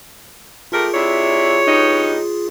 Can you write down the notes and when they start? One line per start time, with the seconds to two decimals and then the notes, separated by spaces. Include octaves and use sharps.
0.72 A3 F4 G4 G#4 A#4
0.94 C3 D4 E4 C#5
1.67 G2 B3 D#4